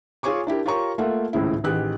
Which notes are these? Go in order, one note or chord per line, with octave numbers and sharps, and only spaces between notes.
F4 G#4 C#5 G#5 C#6 D6
D4 E4 G4 A#4
F4 G4 A#4 C#5 A#5 C#6
A3 A#3 F4 A4 E5 F#5
G#1 C#2 A2 C#3 E4
A1 D#3 G4 G#4 F#6